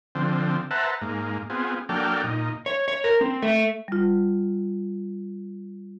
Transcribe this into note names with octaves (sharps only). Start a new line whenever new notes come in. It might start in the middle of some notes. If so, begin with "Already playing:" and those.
D3 F3 C4
B4 C5 E5 F#5 A5 A#5
G#2 A#3
B3 C4 F4 G#4
F#3 A#3 D4 A4 G5 F6
A#2 D#4
C#5
C#5
A#4
C4
A3
G3 F4